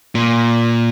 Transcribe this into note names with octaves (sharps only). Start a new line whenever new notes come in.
A#2